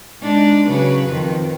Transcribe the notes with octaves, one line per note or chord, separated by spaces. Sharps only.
G#3 D4 D#4
C#3 F#3 B4
F2 D#3